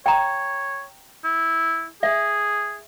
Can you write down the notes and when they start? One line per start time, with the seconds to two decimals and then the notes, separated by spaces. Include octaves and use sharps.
0.06 C#5 G5 A#5
1.24 E4
2.03 G#4 E5